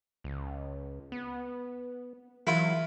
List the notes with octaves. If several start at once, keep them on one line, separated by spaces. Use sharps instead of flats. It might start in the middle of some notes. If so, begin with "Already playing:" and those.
C#2
B3
E3 F#3 E4 F4